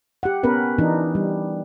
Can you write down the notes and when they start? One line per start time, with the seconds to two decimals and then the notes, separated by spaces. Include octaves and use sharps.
0.23 G4 F#5
0.43 B3 C#4 A#4 B4
0.78 E3 D4 D#4
1.15 G3